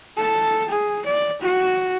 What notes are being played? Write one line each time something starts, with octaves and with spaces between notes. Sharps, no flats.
A4 A5
G#4
D5
F#4